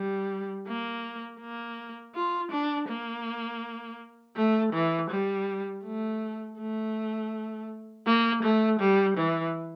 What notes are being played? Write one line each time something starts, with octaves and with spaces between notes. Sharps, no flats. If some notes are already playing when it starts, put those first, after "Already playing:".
Already playing: G3
A#3
A#3
F4
D4
A#3
A3
E3
G3
A3
A3
A#3
A3
G3
E3